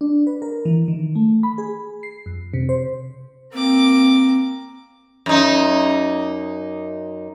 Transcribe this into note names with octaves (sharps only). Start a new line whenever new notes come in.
D4
B4
A#4
E3
D#3
A3
B5
G#4
C7
F2
C3
C5
A#3 C4 D6
F#2 D#4